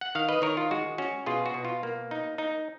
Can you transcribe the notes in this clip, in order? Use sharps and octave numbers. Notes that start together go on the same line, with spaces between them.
F#5
D#3 F5
B4 D#5
D#3 A#4 C#5
F4
G#3 F#4
C#4 F#4
B2 F4 G#4
F#4
B2
F4
A#3
D#4
D#4